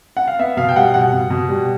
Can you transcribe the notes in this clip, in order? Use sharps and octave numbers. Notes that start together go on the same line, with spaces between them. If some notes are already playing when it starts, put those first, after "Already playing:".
F#5
F5
B3 E5
B2 F5
G5
G3 F#5
B2 F#5
B2
B2
G3